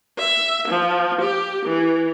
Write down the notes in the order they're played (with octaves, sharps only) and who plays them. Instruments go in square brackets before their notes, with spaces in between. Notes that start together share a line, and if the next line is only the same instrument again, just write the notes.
[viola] E5
F3
G4
E3